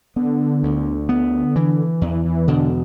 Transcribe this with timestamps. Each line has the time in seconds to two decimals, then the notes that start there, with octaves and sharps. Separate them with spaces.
0.16 D3 B3
0.63 D2
1.09 B3
1.56 E3
2.01 E2 E3
2.25 E3
2.48 B2 D3